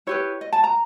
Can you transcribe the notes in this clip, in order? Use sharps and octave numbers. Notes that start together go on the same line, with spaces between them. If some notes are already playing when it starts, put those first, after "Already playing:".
E4 G4 B4 C#5
D#5
A5
A#5